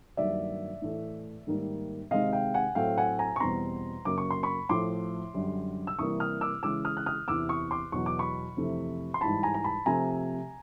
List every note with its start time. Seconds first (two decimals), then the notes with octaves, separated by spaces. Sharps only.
0.17 G2 D#3 F#3 A#3 D5 E5
0.82 A2 E3 A3
1.47 G#2 D#3 G3 A#3
2.11 C3 D#3 G#3 C4 D#5 F5
2.33 F5 G5
2.54 F#5 G#5
2.75 A2 F#3 A3 C4 F5 G5
2.98 F#5 G#5
3.19 G#5 A#5
3.36 C#6
3.40 E2 B2 G3 C4 A#5 C6
4.05 F#2 C#3 F#3 A#3 D6
4.18 C#6
4.31 C6
4.43 B5 C#6
4.69 A2 F3 A3 C6 D6
5.34 F#2 D3 G3
5.87 E6
5.99 C3 E3 G3 A#3 C#6 D#6
6.20 D#6 F6
6.41 D6 E6
6.63 C#3 E3 G#3 D6 E6
6.85 D#6 F6
6.97 F#6
7.06 D#6 F6
7.28 E2 C3 E3 D6 E6
7.49 C#6 D#6
7.71 C6 D6
7.92 E2 B2 F#3 C#6
8.06 D6
8.19 B5 C#6
8.57 F2 C3 E3 A3
9.14 C6
9.21 G#2 E3 G3 A5 B5
9.43 G#5 A#5
9.54 A#5
9.64 A5 B5
9.86 C3 F3 A3 C4 G#5 A#5